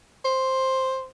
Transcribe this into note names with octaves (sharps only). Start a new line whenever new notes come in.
C5